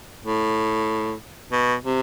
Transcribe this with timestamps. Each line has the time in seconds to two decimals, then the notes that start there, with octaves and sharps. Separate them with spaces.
0.25 A2
1.52 B2
1.84 C3